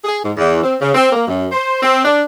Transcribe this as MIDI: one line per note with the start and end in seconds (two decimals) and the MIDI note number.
0.05 0.18 68
0.24 0.32 44
0.37 0.59 40
0.63 0.75 60
0.82 0.94 49
0.94 1.11 60
1.13 1.24 58
1.28 1.45 42
1.52 1.82 72
1.83 2.02 60
2.05 2.22 62